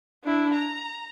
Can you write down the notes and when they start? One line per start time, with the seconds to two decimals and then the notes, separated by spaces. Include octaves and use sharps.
0.24 D4 E4
0.54 A#5